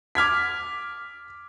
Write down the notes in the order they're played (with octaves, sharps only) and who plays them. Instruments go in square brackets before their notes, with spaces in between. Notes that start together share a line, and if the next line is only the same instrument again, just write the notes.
[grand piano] D6 F6 G#6 B6